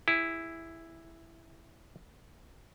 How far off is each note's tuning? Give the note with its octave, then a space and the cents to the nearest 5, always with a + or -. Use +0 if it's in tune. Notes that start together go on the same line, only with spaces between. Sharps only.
E4 +0 G#4 -25